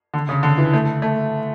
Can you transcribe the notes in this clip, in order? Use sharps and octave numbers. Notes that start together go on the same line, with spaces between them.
D3
C#3
D3
E3
A3
A3